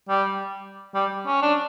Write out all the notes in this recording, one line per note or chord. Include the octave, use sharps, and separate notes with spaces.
G3
G3
C#4
D4